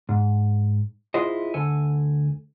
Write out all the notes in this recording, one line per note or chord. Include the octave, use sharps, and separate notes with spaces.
G#2
E4 F4 G#4 C5 D#5
D2 A4 G#5